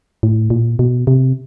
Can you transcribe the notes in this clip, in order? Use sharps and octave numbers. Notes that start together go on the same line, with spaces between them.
A2
A#2
B2
C3